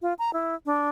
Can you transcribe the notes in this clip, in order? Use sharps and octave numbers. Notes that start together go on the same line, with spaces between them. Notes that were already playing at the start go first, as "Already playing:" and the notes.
F4
A#5
E4
D4